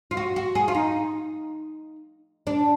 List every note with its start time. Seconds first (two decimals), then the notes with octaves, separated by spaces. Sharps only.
0.11 F4
0.17 F#4
0.36 F#4
0.55 G#4
0.68 F4
0.75 D#4
2.47 D4